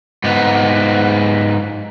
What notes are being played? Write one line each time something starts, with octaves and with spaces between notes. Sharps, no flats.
G#2 B3